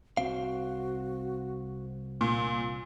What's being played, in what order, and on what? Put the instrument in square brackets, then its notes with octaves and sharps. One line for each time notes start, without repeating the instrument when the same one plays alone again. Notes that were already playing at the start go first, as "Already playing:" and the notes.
[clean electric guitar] C2 C4 F5 [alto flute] F#4
[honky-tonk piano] A#2